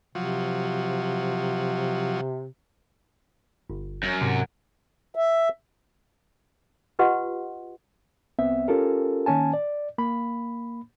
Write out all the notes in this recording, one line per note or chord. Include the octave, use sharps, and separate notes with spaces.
C3 F3 F#3
G1
F#2
G#2 C3
E5
F4 G4 B4 D#5 F#5 C6
C2 B3 C4 E5
C#4 F4 G4 A4 A#4
D#3 A#3 C#4 G#5 A5
D5
A#3 B5